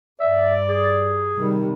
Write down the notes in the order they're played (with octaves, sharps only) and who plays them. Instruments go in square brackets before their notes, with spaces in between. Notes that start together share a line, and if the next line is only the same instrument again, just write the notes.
[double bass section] G2 [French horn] D5 [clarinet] E5
[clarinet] G#4
[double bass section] C3 G3 [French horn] D#3